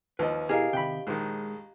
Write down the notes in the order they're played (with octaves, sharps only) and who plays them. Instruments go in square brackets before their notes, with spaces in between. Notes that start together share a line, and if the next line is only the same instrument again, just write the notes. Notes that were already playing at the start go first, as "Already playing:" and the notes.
[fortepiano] D#2 F3 [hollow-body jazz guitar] B4 D#5
[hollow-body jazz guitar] B2 E4 [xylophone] G4 D#5 F5 [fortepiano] G#4 A#4
[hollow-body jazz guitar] C3 D#3 [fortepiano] G5 B5
[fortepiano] A#1 D#3 [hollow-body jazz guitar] G#3 C5